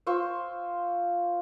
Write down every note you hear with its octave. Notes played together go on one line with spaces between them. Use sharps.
F4 C5 C#6 E6